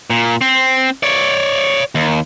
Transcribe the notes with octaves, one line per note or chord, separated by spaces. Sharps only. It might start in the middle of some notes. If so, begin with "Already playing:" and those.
A#2
C4
C#5 D5
D#2